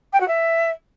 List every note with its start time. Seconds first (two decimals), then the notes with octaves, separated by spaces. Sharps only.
0.13 G5
0.20 F#4
0.28 E5